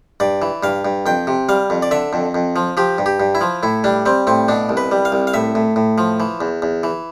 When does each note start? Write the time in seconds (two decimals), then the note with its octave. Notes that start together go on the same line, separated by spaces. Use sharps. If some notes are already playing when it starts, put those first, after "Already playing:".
0.20 G2 D5
0.42 E3
0.63 G2 F5
0.85 G2
1.06 F2 G5
1.27 C3
1.49 G3 F5
1.70 F2
1.82 D5
1.91 D3 E5
2.13 F2
2.35 F2
2.56 F3
2.77 F3 G4
2.98 G2
3.06 G4
3.20 G2
3.35 E4
3.41 F3
3.63 A2 E4
3.84 G3 D4
4.06 G3 C4
4.27 A2 C4
4.48 B2 D4
4.69 C2
4.77 B4
4.91 G3
5.05 F5
5.12 C2
5.27 F5
5.34 A2 E5
5.55 A2
5.76 A2
5.98 F3
6.20 E3
6.41 E2
6.62 E2
6.83 E3